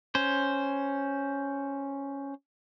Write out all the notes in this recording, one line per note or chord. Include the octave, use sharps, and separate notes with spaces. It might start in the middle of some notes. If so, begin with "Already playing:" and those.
C#4 C5